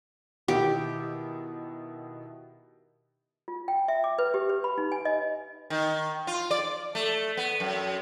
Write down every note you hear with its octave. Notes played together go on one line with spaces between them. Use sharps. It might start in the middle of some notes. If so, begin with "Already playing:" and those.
B2 D#3 E4 G4
F4
G5
E5
D6
B4
G4
B4
B5
D#4
G#5
D#5
D#3
F4
D5
A3
B3
F#2